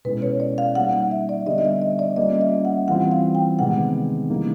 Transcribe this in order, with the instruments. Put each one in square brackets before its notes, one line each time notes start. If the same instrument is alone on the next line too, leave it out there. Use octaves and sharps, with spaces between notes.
[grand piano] B2 G#3 C#4 E4 A4 [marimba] B4
[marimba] C#5
D5
F5
[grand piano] G3 A#3 D#4 [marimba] F#5
[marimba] F#5
E5
D5
[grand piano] D3 G3 B3 [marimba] D#5
[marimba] D#5
E5
D#5
D5
[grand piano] G3 A#3 C#4 F4 [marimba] D#5
[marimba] D#5
E5
F#5
[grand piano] E3 G3 C4 F4 [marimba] F#5
[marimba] F5
G5
[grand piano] C3 D#3 G#3 B3 D#4 [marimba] F#5
[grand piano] C#3 E3 G3 A#3 D#4